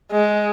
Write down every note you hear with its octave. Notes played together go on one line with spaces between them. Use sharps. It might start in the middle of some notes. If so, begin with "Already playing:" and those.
G#3